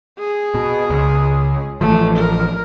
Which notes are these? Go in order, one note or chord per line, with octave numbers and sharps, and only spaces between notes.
G#4
B2
C#2
A1 E3 F3 A3
A#4